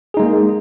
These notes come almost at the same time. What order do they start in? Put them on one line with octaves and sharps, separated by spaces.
G#4 D#4 G#3 A#3